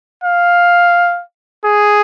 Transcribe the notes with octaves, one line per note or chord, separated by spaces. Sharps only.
F5
G#4